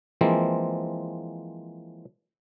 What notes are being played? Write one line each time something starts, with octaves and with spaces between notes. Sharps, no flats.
E3 F3 G#3 A#3 C4